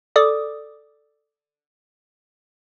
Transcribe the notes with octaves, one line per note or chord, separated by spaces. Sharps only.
A4 D5 D6 D#6